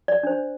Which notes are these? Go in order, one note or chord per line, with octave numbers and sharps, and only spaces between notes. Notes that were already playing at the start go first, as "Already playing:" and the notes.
D5
D4 C5